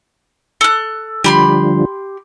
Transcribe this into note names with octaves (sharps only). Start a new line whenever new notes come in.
A4 F#6
D3 F3 G3 G4 B5 C6